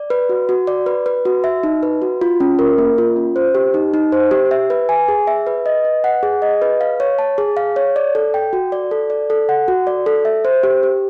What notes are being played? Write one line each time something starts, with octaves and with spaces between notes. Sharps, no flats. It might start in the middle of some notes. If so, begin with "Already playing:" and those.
Already playing: D5
B4
F#4
F#4
D5
B4
B4
F#4
E5
D#4
B4
F#4
F4
C#4
A#4
A#3
F4
C#4
C5
G4
D#4
D#4
C5
G4
E5
B4
G#5
G#4
E5
B4
D#5
B4
F#5
G#4
D#5
B4
F5
C#5
A5
G#4
F5
C#5
D5
A4
G5
F#4
D5
A4
D5
A4
F#5
F#4
D5
A4
E5
C5
G4
G4